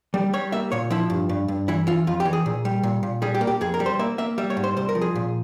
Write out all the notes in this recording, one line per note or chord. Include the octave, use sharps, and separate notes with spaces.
G3
G3 C#5
A#3 E5
A#2 C#5
F3 E4
G2
G2
G2
E3 E4
E3 F4
F2 F4
G4
E3
G#4
A#2
G3
A#2
A#2
G3 G#4
G4
A#3
G4
F2 G#4
A#4
G3
C5
A#3 E5
A#3 E5
G3 E5
C#5
G#2
C5
C2 C5
A#4
F3
G#4
A#2